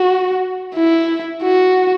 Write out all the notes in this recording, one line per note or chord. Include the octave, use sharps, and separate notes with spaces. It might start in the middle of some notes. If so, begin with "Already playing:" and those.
Already playing: F#4
E4
F#4